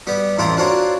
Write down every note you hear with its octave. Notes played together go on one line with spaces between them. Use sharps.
G3 B3 G4
A1 F2 E4 F4 G5 A#5
C4 D4 F4 F#4 A#4 C#5